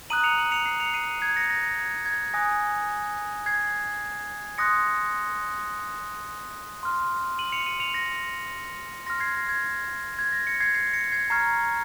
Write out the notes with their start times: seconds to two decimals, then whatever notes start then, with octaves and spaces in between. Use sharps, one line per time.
0.10 A#5 D#6 F#6 D#7 F#7
0.24 C#7 F7
0.38 D#7 F#7
0.52 C#7 F7
0.66 C7 D#7
0.80 C#7 F7
0.94 C7 D#7
1.22 G#6 C7
1.36 A#6 C#7
1.50 A#6
1.63 A#6
1.78 G#6
2.06 G#6
2.34 G#5 D#6 F#6 A#6
3.46 G#6 C7
4.58 C6 D#6 F#6 A#6 C#7
6.83 C6 F6
7.39 D#7 F#7
7.52 C#7 F7
7.66 D#7 F#7
7.80 C#7 F7
7.94 A#6
9.06 C6 F6 A#6
9.20 G#6 C7
9.35 A#6
9.49 G#6
10.19 G#6
10.32 A#6
10.47 A#6 C#7
10.60 G#6 C7
10.74 G#6 C7
10.93 A#6 C#7
11.12 G#6 C7
11.30 A#5 C#6 F6 G#6 C7